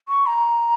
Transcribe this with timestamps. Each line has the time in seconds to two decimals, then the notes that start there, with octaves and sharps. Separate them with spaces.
0.08 C#6
0.26 A#5